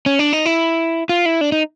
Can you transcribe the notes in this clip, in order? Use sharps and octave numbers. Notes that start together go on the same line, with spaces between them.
C#4
D4
D#4
E4
F4
E4
D4
D#4